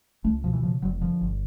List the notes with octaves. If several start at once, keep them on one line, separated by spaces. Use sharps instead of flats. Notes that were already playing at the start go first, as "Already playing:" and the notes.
C#2 A3
B2 F3
E3
C#3 F3
F1 F#3
D3 F3
G1